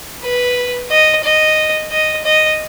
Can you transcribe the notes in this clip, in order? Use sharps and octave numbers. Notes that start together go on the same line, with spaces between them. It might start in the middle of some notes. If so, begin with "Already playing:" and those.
B4
D#5
D#5
D#5
D#5